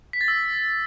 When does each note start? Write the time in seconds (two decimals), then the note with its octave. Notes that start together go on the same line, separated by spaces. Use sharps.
0.13 B6
0.21 A6
0.28 E6